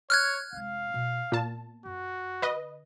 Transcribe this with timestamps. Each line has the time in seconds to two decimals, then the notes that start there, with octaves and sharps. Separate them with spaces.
0.10 C#5 F6 F#6 G#6
0.53 F1 G#3 F5
0.94 B2 E4
1.32 A#2 B3 A5
1.85 F#2 F#4
2.42 D3 B4 D#5